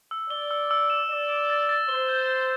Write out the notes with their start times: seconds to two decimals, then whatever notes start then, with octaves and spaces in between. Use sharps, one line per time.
0.11 E6
0.30 D5 G7
0.51 E6
0.71 E6
0.90 E7
1.09 D5 E7
1.30 E7
1.50 A6
1.69 A6
1.89 C5 G7
2.09 G6
2.29 G6